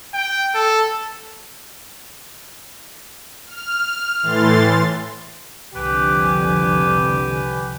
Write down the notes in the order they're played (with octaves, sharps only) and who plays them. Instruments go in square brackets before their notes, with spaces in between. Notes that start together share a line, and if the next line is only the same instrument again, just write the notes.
[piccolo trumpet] G5
A4
[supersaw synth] F6
A2 E3 C6 A6
[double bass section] C2 F2 D3 [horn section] G4 B4 G#5